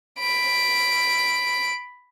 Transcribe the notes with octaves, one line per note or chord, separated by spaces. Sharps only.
B5 D7